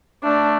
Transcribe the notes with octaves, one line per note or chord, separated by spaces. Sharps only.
A3 D4